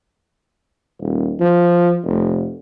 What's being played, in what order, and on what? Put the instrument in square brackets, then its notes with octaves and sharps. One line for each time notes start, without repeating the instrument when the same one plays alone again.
[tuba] D#1
F3
F1